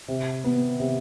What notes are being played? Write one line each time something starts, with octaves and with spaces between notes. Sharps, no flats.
C3
B3
C3